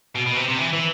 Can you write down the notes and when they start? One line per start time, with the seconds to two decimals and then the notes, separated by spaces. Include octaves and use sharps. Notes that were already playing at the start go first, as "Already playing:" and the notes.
0.15 B2
0.26 B2
0.36 C3
0.48 C3
0.58 E3
0.73 E3